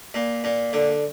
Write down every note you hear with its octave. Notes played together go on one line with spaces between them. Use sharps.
A#2
A#2
D3